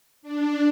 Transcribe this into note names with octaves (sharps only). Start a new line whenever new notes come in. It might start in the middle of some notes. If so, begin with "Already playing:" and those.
D4